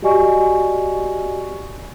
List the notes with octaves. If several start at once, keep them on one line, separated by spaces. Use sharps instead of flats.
F#4 G4 D5 D#5 G#5 C#6